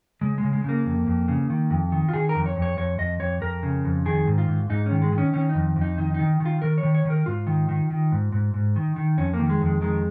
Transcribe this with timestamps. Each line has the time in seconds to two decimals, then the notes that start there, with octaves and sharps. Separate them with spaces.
0.21 C#3 G#3
0.38 C#3 G#3
0.53 G#3
0.64 C#3 A#3
0.85 F2
1.07 F2
1.28 C#3
1.50 D#3
1.70 F2
1.92 D#3
2.09 F4
2.14 D#3 G#4
2.29 A#4
2.35 F2
2.46 C#5
2.56 F2
2.62 C#5
2.77 F2 C#5
2.98 F2 D#5
3.20 F2 C#5
3.41 F2 A#4
3.63 C#3
3.85 F2
4.06 D#3 G#4
4.27 G#2
4.38 F4
4.48 G#2
4.70 G#2 D#4
4.86 D#3 C#4
5.02 G#3
5.12 D#3
5.18 C#4
5.34 D#3 C#4
5.49 D#4
5.55 F2
5.76 F2
5.82 D#4
5.97 D#3 D#4
6.14 D#3 D#4
6.40 D#3
6.45 F4
6.62 D#3 A#4
6.78 C#5
6.83 D#3
6.94 C#5
7.05 D#3 A#4
7.26 G#2 F4
7.47 D#3
7.69 D#3
7.91 D#3
8.12 G#2
8.32 G#2
8.54 G#2
8.76 D#3
8.96 D#3
9.18 F2 C#4
9.34 A#3
9.39 D#3
9.50 G#3
9.61 F2 G#3
9.82 D#3 G#3